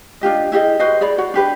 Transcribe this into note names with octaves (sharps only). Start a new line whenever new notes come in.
D4 F4 G4 D#5
E4 G4 G#4 D#5
F#4 B4 C5 D#5
G#4 C#5 D5 B5
F#4 C#5 F#5
D4 G4 B4